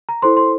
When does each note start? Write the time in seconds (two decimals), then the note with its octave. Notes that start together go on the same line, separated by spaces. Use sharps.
0.09 A#5
0.22 E4 A4 C5 C6
0.37 C6